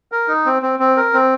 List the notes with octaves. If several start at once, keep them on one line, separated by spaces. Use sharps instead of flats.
A#4
D#4
C4
C4
C4
A#4
C4